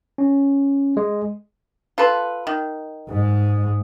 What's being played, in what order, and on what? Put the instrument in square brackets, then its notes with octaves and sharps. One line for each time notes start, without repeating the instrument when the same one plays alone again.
[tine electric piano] C#4
G#3
[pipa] F4 A4 B4
D#3
[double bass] G#2 G#3